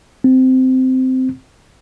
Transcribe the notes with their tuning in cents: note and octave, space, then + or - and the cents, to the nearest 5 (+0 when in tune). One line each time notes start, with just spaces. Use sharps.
C4 -15